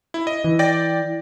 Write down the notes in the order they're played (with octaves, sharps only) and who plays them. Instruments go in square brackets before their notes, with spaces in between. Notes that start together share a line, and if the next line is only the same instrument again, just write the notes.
[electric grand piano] E4
D#5
[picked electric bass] E3
[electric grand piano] D5 G5 A#6